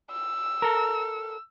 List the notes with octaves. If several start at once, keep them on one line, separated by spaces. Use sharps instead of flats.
E6
A4 A#4